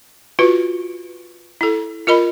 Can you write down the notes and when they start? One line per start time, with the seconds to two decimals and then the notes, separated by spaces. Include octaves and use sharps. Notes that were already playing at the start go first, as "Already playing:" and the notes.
0.39 F4 F#4 B4
1.61 E4 A4
2.07 F4 A#4 D#5 B5